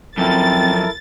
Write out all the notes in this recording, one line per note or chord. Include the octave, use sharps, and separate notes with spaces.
F#2 F3 C4 E4 A4 A#4 A6